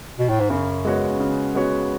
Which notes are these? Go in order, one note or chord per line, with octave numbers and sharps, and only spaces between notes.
B2
A2
G#2
F#2 C#3
G#3 B3 F#4 C#5
C#3
G#3 B3 F#4 C#5